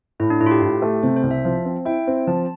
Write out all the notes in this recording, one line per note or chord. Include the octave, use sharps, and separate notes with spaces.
A2 E4
D4
A2 E4
F4
G4
A2 G4
A3
C3 C5
C5
C2
E5
F3 F5
C4
E4 G5
C4
F3 A5